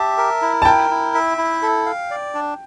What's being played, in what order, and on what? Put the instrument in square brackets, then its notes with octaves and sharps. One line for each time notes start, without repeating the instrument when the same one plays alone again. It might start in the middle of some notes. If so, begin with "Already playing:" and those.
Already playing: [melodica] G4 E5 [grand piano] A5
[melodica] A#4
E4
[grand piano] A5
[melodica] A#4 [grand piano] G5
[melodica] E4
E5
E4
A4
F5
D5
D4